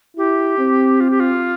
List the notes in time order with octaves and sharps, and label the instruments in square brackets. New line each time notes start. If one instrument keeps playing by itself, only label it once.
[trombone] E4 [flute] G4
[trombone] C4
[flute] F4
G4
F4